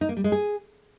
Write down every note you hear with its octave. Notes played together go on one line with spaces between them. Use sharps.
D#4
A#3
G3
G#3
G#4